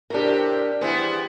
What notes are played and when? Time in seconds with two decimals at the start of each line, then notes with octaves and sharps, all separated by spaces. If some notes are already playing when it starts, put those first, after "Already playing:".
0.10 A2 C3 D4 G4 A#4
0.81 E3 G3 B3 E4 G#4 C5